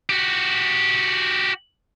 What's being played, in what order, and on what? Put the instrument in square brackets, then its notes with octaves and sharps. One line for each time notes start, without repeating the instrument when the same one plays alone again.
[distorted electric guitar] F#4 G4